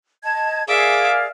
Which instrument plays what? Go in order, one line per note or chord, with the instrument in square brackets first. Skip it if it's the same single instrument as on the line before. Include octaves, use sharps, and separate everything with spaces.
[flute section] D#5 A5 G#6
[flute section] G#4 [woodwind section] A#4 D5 F5 [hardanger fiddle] E5 D6